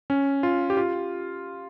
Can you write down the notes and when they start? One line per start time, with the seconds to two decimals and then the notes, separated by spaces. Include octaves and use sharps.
0.10 C#4
0.43 F4
0.70 G4
0.77 F4